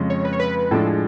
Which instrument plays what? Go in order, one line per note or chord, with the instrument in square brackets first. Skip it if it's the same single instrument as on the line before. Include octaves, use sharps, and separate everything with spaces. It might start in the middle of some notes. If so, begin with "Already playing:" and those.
Already playing: [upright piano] F2 C#3 G#3 C#4
[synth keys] C#5
B4
C#5
B4
[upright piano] A2 F3 G#3 D4 [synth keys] A4
[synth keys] G#4